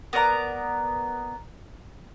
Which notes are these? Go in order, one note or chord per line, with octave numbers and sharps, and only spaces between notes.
B3 A#4 D5 A#5